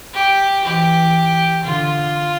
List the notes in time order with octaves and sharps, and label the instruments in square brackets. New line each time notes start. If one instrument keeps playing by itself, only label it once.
[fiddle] G4
[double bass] E3 [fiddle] G4
[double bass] D3 [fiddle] F4